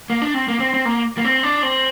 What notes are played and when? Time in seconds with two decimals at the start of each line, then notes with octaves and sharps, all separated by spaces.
0.10 A#3
0.22 D4
0.34 C4
0.48 A#3
0.60 C4
0.74 C4
0.85 A#3
1.18 A#3
1.24 C4
1.43 D4
1.63 C4